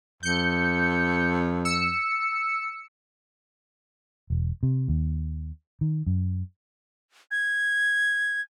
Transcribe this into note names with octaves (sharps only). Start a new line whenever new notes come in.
F2 G6 C#7
E6 C#7
E1
C3
D#2
D#3
F#2
G#6